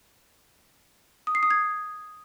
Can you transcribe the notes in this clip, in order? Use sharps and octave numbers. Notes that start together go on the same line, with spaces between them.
D#6
C7
D#6
G#6